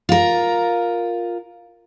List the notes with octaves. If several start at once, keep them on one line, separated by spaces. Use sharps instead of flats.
F4 A#4